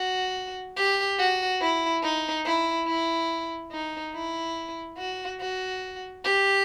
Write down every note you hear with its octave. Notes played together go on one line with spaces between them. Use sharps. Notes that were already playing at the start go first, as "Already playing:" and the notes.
Already playing: F#4
G4
F#4
E4
D#4
E4
E4
D#4
E4
F#4
F#4
G4